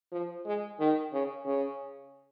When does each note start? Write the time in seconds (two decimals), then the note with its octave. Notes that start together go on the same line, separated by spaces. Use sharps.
0.12 F3
0.46 G#3
0.79 D#3
1.13 C#3
1.46 C#3